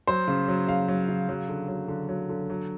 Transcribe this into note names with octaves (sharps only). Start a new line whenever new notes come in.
F#3 C5
C#3
F#3
C#3 F5
F#3
C#3
F#3
D3
F#3
D3
F#3
D3
F#3